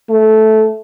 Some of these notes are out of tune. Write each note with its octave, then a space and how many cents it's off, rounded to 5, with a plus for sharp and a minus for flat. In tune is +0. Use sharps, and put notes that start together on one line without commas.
A3 -10